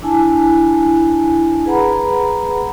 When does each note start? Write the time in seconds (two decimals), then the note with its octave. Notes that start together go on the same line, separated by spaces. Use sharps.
0.02 D4 E4 G#5 A5
1.66 G#4 B4 F#5 A#5 B5